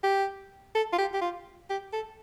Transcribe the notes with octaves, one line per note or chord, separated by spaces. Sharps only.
G4
A4
F4
G4
G4
F4
G4
A4